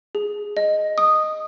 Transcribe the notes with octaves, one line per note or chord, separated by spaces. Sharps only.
G#4
D#5
D#6